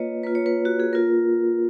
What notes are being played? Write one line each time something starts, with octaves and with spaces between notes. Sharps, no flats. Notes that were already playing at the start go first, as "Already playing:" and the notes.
Already playing: A#3 F4 B4 C#5 D#5
A#3 F4 B4
C#5
B4
F#4
G#4
A#3 F4 A#4